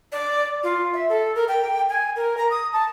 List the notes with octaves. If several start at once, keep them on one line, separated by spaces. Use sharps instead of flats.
D5
F4
E5
A4
A#4
G5
G#5
A#4
A#5
D#6
A5